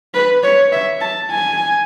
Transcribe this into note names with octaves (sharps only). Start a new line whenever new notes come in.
B4
C#5
E5
A5
G#5